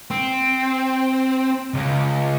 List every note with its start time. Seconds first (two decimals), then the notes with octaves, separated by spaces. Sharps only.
0.11 C4
1.74 C#2